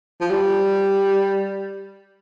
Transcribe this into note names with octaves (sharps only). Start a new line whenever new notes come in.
F3
G3